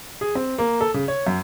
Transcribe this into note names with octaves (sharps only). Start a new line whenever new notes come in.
G#4
C4
A#3
A4
C#3
C#5
F#2